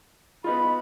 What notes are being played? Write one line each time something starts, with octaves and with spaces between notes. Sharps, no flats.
B3 D#4 F4 B5